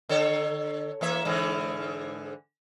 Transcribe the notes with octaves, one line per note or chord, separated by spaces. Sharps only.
D3 A4 C#5
E3 A#3 E5
G#2 D3 E3